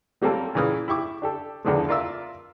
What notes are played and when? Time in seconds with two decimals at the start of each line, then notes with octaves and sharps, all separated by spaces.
0.21 F#3 G3 A#3 C4 A4 A#4
0.55 A#2 C#3 E3 D#6 F6
0.88 E4 G4 C#6 D6
1.22 D4 G4 A4
1.64 E2 D3 E3 F3 G#3
1.89 F4 A#4 D5 E5 E6